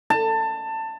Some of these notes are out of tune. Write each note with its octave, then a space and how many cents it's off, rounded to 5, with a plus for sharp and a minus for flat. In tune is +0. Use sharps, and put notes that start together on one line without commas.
A5 +20